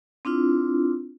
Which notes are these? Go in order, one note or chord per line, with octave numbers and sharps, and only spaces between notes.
C4 D4 E4 F4